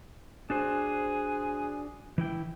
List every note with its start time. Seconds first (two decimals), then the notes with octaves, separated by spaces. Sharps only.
0.50 D4 F#4 G#4 C5
2.18 E3 E4 G5